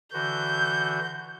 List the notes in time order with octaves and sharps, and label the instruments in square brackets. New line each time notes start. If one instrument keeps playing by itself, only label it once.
[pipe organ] D3 E3 F#4 [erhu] G6